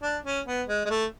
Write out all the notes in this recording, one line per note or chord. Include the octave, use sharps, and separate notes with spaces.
D4
C#4
B3
G#3
G#3
A3